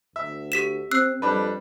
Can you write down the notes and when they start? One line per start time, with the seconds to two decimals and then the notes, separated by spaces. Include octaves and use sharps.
0.16 D2 E5
0.52 G4 B6 E7
0.91 C4 E6 F#6 C7
1.22 F2 G3 D4 B4